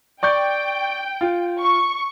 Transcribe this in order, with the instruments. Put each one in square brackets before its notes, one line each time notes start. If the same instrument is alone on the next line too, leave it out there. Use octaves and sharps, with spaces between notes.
[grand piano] D5 C#6 G6 [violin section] G5
[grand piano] F4
[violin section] C#6